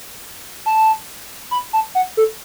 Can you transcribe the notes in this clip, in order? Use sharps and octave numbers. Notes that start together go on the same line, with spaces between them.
A5
B5
A5
F#5
A4